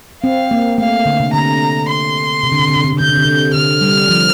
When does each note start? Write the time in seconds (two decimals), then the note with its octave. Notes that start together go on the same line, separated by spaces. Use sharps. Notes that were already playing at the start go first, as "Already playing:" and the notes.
0.23 C4 F5
0.51 A#3
0.78 A3 F5
1.05 D3
1.20 C3
1.33 D3 A#5
1.88 C6
2.43 C3
2.52 D3
2.59 C3
2.68 D3
2.76 C3
2.85 D3
2.92 C3
2.99 D3 G6
3.09 C3
3.17 D3
3.25 C3
3.54 D3 F6
3.81 G3
4.09 F3